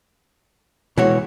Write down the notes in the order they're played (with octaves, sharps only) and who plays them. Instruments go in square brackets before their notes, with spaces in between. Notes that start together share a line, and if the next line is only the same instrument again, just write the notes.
[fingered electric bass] B2 G#3 [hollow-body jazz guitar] E3 F#4 C#5